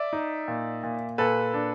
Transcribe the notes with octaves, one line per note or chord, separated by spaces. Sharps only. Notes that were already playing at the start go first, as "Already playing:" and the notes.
Already playing: D5 E5
D#4
A#2
A#2
A#2 A4 B4
D4